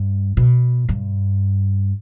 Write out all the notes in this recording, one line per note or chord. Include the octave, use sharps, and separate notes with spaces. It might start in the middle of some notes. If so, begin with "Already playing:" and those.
Already playing: G2
B2
G2